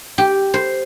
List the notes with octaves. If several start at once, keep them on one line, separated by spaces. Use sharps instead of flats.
G4
C5